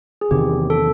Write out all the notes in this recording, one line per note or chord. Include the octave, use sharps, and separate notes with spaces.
G#4
E2 C3 D#3 G4
A4